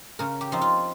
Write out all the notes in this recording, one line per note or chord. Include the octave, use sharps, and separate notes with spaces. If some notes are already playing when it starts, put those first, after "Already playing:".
C#3 A#4
G4
F3 C4 D#4
F4